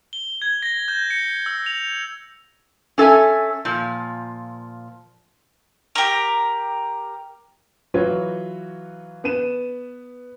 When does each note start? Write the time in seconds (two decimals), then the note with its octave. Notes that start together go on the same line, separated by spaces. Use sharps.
0.13 G7
0.42 G#6
0.62 A#6
0.88 G6
1.10 C#7
1.46 E6
1.66 F7
2.98 C#4 A4 E5 G#5
3.65 A#2 F3
5.95 G4 A#4
7.94 E3 F#3 F4 F#4 B4 C#5
9.24 B3 B4 D#7 E7